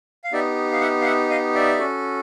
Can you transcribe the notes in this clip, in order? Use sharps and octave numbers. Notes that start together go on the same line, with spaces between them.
F5
B3 D#4 G4 D5 E5
F5
E5 F#5
F5
E5 F#5
D#5 F5
D5 E5
C#4 F#4 A4